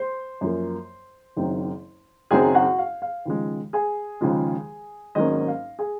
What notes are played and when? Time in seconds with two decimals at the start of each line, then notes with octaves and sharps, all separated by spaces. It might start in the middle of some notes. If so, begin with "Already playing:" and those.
Already playing: C5 C6
0.41 F#2 F3 A#3
1.37 F#1 F#2 D#3 F#3 C4
2.31 F#1 F#2 D#3 F#3 C4 G#4 G#5
2.55 F#4 F#5
2.78 F5
3.02 F5
3.25 D#2 C#3 F3 G#3
3.73 G#4 G#5
4.21 D#2 C#3 F3 G#3
5.15 G#1 G#2 F#3 A#3 C#4 D#5
5.48 F5
5.79 G#4 G#5